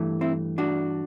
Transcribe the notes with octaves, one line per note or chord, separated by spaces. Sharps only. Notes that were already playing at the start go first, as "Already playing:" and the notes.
Already playing: G2 E3 A3
C4 E4
D4 F#4